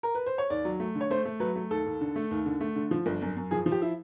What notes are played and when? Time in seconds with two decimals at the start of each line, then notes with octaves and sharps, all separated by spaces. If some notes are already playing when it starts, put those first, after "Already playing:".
0.03 A#4
0.15 B4
0.26 C5
0.38 C#5
0.50 D#2 D5
0.65 F#3
0.80 A3
0.95 D3
1.01 C#5
1.10 A3 C5
1.25 A3
1.40 F#3 B4
1.56 A3
1.70 D#2 A4
1.86 D#2
2.01 D3
2.16 A3
2.31 D#2
2.46 D3
2.61 A3
2.76 D3
2.91 F3
3.06 G1
3.22 F#2
3.37 F#2
3.51 F3 G#4
3.66 F3
3.72 G4
3.82 E4